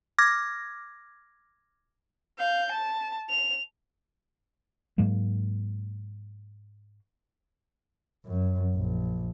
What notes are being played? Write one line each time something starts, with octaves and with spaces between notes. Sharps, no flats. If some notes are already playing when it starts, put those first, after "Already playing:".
D6 F6 G#6 A#6
F5 G6
A5
F7
G#2 F#3 G#3 A#3
F#2
A#1